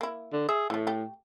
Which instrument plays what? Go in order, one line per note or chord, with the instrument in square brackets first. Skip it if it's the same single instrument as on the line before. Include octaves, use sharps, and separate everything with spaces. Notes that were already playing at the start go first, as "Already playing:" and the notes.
[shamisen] A#3 E4
[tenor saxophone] D3
[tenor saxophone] G#4 [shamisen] E5
[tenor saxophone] A2 [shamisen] E3 A3
[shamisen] A3 G4